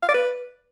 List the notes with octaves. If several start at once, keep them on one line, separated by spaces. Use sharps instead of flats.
F5
D5
B4